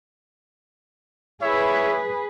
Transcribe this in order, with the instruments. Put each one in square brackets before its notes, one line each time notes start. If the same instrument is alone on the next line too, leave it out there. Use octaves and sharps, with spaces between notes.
[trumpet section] E4 C#5 E5 [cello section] G#4 B4